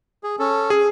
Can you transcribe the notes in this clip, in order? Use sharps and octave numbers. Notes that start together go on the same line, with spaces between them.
G#4
C#4 A4
G#4